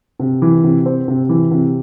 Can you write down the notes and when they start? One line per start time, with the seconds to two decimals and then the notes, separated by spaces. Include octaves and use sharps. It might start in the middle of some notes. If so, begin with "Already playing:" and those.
0.19 C3
0.42 E3
0.64 C3
0.86 C4
1.08 C3
1.29 E3
1.51 C3